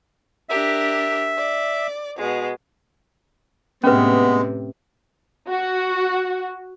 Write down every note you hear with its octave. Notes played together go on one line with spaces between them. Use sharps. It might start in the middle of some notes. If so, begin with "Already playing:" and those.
D4 G4 A#4 E5
D5
B2 G#3
A2 C3 G#3 B3 C#4 B4
F#4